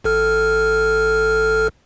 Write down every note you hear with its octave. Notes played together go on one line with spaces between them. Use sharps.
G#1 A4 F6